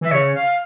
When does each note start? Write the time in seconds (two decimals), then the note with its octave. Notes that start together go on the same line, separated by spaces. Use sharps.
0.01 E3 E5
0.11 C#3 C#5
0.34 F5